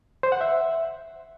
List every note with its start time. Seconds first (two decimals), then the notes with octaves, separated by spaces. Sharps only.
0.23 C5
0.32 F#5
0.41 E5